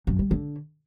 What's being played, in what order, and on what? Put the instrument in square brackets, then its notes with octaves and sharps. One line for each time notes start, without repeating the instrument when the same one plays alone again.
[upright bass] F#2
G3
D3